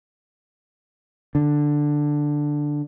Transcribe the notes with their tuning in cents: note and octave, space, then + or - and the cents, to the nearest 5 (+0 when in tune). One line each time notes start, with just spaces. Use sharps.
D3 +5